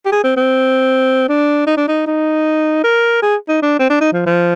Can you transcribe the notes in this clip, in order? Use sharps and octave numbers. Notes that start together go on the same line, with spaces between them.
G4
G#4
C4
C4
D4
D#4
D4
D#4
D#4
A#4
G#4
D#4
D4
C4
D4
D#4
F3
F3